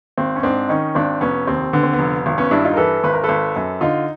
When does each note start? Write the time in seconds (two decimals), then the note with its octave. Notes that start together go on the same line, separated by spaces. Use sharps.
0.18 G#1 C4
0.36 C#4
0.43 G#2 C4 D4
0.69 D#3 C#4 D#4
0.95 G#1 C4 D4
1.21 F1 B3 C#4
1.47 D#2 C4
1.73 D3 B3
1.83 C4
1.93 B3
1.99 F1
2.26 G#1
2.38 B3 C#4
2.51 G2 D4 E4
2.64 D#4 F4
2.73 A#4
2.77 E3 A4 B4
3.04 G#1 B4
3.13 A#4
3.24 A4 B4
3.29 G#1
3.56 F#2
3.81 D3 D#4 F4